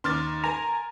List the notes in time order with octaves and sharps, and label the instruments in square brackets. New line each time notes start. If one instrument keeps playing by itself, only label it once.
[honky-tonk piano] D#2 D6 F6 [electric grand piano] C6 A6
[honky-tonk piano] A#4 G#5 [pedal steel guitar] A#5